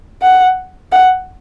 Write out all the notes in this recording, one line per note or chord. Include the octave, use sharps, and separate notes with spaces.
F#5
F#5